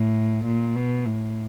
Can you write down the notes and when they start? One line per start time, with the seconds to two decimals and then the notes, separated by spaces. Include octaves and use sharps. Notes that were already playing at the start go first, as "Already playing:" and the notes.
Already playing: A2
0.46 A#2
0.76 B2
1.06 A2